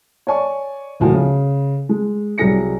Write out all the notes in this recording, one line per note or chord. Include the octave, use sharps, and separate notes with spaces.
C#5 D5 G#5 C#6
E1 D2 A2 F3 F#4 G#5
C#3
G#3
C2 F#3 G3 G#4 A#6 C#7